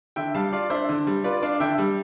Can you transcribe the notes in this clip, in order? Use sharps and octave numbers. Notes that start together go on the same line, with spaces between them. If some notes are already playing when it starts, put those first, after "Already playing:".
D3 E5 G5
G3 F5 A5
F4 D5 F5
D4 C5 E5
D3
G3
F4 B4 D5
D4 D5 F5
D3 E5 G5
G3